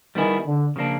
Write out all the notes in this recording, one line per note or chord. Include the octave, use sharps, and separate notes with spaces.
D#3 G3 B3 E4 G#4
D3
C#3 F3 A#3 D4